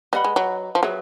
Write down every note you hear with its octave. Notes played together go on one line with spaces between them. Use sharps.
G3 B4 D#5 F#5 B5
G#3
F#3
F3
F#3 G#4 B4 E5